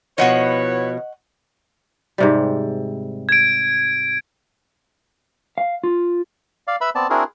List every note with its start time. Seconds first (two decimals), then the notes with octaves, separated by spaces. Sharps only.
0.18 B2 F3 E4 B4 C#5 D#5 F#5 C#6
2.18 G#2 C3 G3
3.29 G#6 D7
5.58 F5
5.84 F4
6.67 D5 F5
6.81 B4 E5 B5 E6
6.95 B3 C4 D5 A5
7.10 C4 D4 E4 F#4 G#4 A#4